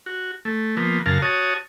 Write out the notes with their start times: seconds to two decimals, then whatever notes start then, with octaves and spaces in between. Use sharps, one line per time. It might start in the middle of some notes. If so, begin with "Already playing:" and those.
0.06 F#4
0.45 A3
0.77 F3 A#3 B3
1.06 F#2 C#3 A#4 F5 A5
1.22 F#4 C#5 A5 D#6